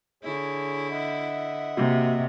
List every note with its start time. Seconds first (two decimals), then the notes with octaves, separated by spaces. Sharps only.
0.23 D3 E4 G#4 C#5
0.91 D#5 E5 F#5
1.77 C3 A#3 F#4